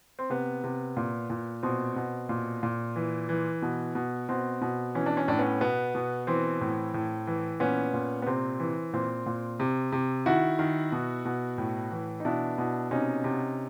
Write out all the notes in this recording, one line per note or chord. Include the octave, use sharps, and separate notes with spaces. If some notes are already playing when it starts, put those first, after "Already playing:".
C4
C3 B3
C3
A#2
A#2
B2 C4
B2
A#2
A#2
E3
E3
B2
B2
B2 C4
B2
E3 C#4
D4
C#4
A2 D4
B3 C#4
B2 B3
B2
E3 C4
A2
A2
E3
A#2 B3 C#4
A#2
B3
C3 C4
E3
A#2 C4
A#2
C3
C3
D#3 E4 F#4
D#3
B2
B2
A2
E3
D#4
B2 D4 E4
B2
C3 C#4 D#4
C3